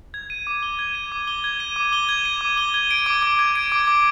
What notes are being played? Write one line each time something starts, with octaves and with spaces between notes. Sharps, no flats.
G#6
D#7
D6
G7
G#6
D#7
D6
G7
G#6
D#7
D6
G7
G#6
D#7
D6
G7
G#6
D7
D6
D6
G#6
D7
D6
D6